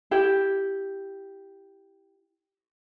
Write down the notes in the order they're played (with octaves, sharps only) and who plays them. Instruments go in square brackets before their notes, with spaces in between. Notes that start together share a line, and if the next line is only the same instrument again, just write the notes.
[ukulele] E4 G4